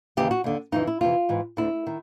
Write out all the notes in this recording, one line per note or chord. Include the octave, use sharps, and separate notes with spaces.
D#2 C#3 E3 G4
F#4
D#2 D3
F2 C#3 E3 D#4
E4
F2 C3 E3 F4
G#2 E3
D2 D3 E4
D#3